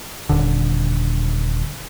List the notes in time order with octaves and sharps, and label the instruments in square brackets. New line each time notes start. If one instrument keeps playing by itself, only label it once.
[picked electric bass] D#1 D3